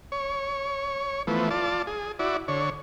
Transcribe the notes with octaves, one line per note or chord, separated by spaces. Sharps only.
C#5
E3 F3 A3 B3
F4 D5 A5
G#4
E4 F#4 D5
D3 C#5